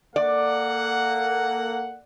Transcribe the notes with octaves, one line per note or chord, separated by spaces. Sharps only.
A#3 A4 D5 F#5